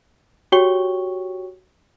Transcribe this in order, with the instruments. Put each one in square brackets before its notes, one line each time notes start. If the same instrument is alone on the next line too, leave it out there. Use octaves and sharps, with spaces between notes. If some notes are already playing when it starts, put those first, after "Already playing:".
[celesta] F#4 G4 C#5 G5 C#6 G7